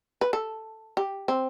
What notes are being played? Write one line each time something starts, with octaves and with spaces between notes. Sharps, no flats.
B4
A4
G4
C4